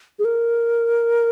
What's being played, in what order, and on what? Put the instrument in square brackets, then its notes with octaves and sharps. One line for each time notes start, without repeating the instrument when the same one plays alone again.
[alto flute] G#4
A#4